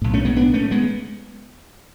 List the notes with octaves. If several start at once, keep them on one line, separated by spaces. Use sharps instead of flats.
B1 A2
A3 C#4
G#3 B3
B3 D4
A3 C#4
G#3 B3